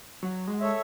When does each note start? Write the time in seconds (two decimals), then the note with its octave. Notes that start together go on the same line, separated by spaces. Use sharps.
0.23 F#3 F#4
0.47 G#3
0.59 A4 C#5 E5